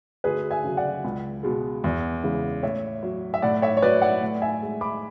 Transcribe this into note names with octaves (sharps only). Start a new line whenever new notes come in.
D2 G#4 B4
E5 G#5
C#3 F#3
D5 F#5
C#2
B2 G#3
E2
C#3 E3 G#3
A2 C#5 E5
F#3
E5
A2 D5 F#5
C#5 E5
C#5
F#3 B4 D5
D5 F#5
A2
E5 G#5
G#3
B5 D6